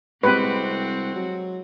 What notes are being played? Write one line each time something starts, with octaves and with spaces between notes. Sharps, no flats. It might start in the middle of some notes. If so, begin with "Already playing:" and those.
C2 G#3 C4 F#4 G4 B4
F#3